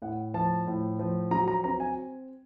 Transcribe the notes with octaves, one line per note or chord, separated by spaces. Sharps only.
A2 F#5
F3 A5
A2
F3
F#3 A#5
A#5
C4 A#5
G#5